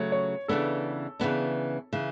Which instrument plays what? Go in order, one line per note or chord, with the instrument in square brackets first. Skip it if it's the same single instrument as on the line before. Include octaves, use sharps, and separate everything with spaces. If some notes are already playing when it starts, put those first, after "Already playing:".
Already playing: [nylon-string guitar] C#3 F#3 A3 [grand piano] C#5
[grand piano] C#5
[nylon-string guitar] C#3 E3 B3 D4 [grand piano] A4
[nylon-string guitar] C#3 E3 B3 D4
C#3 E3